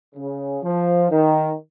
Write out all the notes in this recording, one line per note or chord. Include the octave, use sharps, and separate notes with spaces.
C#3
F3
D#3